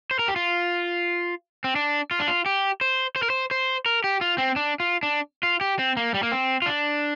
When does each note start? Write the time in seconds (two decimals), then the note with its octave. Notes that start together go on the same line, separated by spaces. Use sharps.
0.11 C5
0.19 A#4
0.28 G4
0.36 F4
1.64 C4
1.76 D4
2.11 F4
2.20 D4
2.28 F4
2.46 G4
2.81 C5
3.16 C5
3.23 A#4
3.30 C5
3.51 C5
3.86 A#4
4.04 G4
4.21 F4
4.38 C4
4.56 D4
4.80 F4
5.03 D4
5.43 F4
5.61 G4
5.79 C4
5.97 A#3
6.14 G3
6.23 A#3
6.32 C4
6.62 F4
6.66 D4